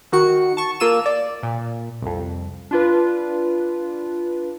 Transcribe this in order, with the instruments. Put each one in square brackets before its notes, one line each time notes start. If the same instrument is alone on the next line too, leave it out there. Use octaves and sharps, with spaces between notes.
[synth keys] D#3 F#4 C#7
A5 C#6
A#3 F4 E6 D#7 E7
D5
A#2
C2 F2
D4 F4 B4